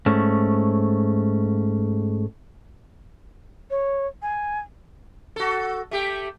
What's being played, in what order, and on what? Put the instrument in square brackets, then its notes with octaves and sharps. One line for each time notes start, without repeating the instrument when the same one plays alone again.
[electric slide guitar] G#2 A3 C#4
[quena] C#5
G#5
[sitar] F#4 A4
A3 G4